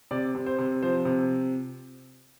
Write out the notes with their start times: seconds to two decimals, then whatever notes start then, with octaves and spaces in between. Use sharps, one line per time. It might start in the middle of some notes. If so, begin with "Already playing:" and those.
0.11 C3 D5
0.35 C3
0.46 C5
0.59 C3
0.83 F3 C5
1.05 C3